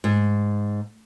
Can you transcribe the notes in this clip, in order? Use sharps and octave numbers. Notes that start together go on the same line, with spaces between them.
G#2